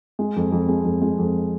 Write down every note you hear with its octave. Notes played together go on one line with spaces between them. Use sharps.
G#3
F2
F2
G#3
F2
G#3
F2